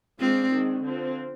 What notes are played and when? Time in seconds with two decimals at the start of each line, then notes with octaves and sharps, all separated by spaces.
0.20 G#3 C4 D4 F4 C5
0.52 D#3 G#3 D4
0.83 D3 F3 C4 F4